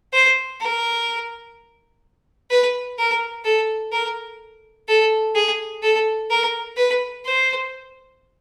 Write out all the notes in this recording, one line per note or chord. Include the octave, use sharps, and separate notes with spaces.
C5
A#4
B4
A#4
A4
A#4
A4
G#4
A4
A#4
B4
C5